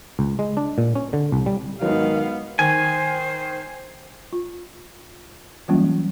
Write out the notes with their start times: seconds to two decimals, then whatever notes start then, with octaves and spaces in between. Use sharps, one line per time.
0.19 C#2
0.39 G#3
0.57 D4
0.78 A#2
0.95 C#4
1.13 D3
1.32 C2
1.46 G3
1.81 G#2 D#3 F#3 B3 F5
2.59 D#3 C5 G#5
4.33 F4
5.68 E3 F#3 G3 A#3 C#4 F4